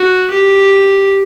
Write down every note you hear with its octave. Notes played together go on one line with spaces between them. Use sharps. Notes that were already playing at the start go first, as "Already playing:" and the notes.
Already playing: F#4
G4